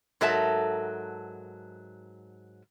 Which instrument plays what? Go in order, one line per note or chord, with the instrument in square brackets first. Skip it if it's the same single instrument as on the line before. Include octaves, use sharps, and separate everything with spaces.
[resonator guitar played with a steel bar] G#2 F#3 A4 A#4 E5 A5